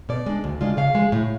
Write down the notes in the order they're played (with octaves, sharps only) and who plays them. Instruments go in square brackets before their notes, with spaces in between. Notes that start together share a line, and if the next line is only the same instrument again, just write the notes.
[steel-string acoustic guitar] B2 D5
G#3 D4
D2
C#3 G#3 D4 F4
C#3 F5
F3 G#3
A2